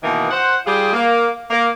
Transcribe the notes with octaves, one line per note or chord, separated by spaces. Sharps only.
B2 D#3 E3 A#3 B3
C5 F#5
G3 F4 G4 G#4
A#3
A#3